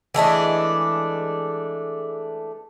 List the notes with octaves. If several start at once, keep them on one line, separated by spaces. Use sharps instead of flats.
E3 G#3 A3 D4